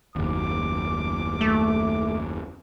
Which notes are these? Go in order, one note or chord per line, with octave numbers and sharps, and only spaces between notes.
F#1 D#2 D6
A3